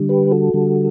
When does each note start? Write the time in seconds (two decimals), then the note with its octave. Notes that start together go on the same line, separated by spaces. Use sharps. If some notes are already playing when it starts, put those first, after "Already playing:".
Already playing: D3 G3
0.09 G4 B4
0.31 F#4 A4
0.54 D3 G3